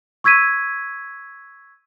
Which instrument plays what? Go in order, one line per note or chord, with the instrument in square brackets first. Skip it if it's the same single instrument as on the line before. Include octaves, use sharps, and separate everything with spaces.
[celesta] C#6 E6 G#6 B6 D#7